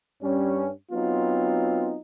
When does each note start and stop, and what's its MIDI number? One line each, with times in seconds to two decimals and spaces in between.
0.23 0.69 43
0.23 0.69 55
0.23 0.69 61
0.92 1.96 54
0.92 1.96 59
0.92 1.96 60
0.92 1.96 63
0.92 1.96 65